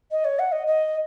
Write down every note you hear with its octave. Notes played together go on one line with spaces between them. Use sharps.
D#5
C#5
F#5
D#5
D#5